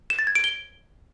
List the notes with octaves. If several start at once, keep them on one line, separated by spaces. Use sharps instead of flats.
E7
A6
G#6
D7
G7